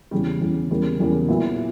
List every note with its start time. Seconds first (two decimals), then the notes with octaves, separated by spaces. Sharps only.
0.11 E2 C#3 G3
0.41 E2 C#3 G3
0.70 E2 C#3 G3 A#3
1.00 E2 C#3 G3 A#3
1.29 A#2 F#3 B3 E4